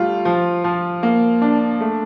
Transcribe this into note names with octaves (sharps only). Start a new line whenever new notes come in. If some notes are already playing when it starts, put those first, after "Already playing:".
Already playing: G3 A3 F4
F3
F3
A#3
D4
A3